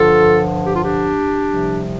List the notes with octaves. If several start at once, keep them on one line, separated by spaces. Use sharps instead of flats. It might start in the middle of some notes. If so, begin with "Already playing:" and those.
Already playing: G2 D3 F3 F4 A4
G4
F4
D4 G4
C2 C3 F3